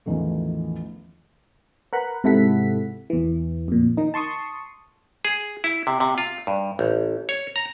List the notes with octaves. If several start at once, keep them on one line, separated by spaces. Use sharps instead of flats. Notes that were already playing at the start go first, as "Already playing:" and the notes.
A1 E2 D#3 F3 A3
A#4 B4 F#5 B5
G#2 C3 E4 A4 F#5 B6
E2 E3
F2 A#2
D#3 D#4
A5 C6 C#6 D#6
G#4
E4
C3
C3
F4
G2
A1
C#5
A#5